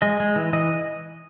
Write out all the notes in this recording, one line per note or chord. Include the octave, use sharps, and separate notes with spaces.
G#3 D#5
G#3
E3
E3 D#5